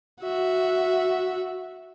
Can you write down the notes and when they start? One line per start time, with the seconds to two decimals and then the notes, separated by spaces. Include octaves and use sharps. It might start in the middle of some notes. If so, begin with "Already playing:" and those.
0.22 F#4 E5